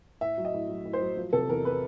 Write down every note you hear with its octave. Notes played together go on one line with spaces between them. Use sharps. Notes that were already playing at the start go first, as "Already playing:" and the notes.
A2 E5
F#3
D#5
A2
F#3
A2
C5
F#3
F3
C3 A4
E2 A#4
B4